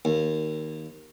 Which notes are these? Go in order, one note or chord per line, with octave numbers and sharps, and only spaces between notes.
D#2